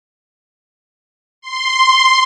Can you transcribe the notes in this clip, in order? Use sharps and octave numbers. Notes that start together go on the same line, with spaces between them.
C6